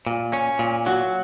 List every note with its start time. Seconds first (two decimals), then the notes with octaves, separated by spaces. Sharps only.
0.06 A#2
0.33 C#4
0.59 A#2
0.86 F#3 F#4